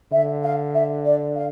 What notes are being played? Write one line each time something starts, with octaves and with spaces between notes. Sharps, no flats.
D3 E5
F5
E5
D5
F5